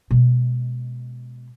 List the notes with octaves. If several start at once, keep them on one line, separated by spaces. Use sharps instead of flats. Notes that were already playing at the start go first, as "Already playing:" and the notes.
B2 G#3